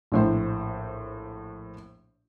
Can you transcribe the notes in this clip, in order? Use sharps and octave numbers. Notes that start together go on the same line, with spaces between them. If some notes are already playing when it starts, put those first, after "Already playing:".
A#1 A2 C5